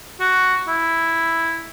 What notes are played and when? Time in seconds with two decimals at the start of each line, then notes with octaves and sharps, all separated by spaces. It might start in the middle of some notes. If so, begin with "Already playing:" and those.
0.20 F#4
0.68 E4